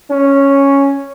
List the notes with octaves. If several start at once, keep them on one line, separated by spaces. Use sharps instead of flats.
C#4